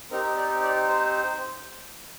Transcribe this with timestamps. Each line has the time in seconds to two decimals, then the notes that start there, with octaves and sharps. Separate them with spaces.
0.10 C4 D#4 G4 A#4
0.36 D5
0.62 D5
0.88 C5